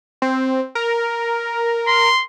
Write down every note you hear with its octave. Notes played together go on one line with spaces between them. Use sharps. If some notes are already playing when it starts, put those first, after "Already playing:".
C4
A#4
C6